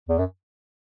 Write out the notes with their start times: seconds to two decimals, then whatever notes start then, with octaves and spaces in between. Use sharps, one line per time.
0.09 E2
0.19 F#2